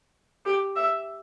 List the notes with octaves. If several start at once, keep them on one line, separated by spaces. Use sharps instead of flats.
G4
E5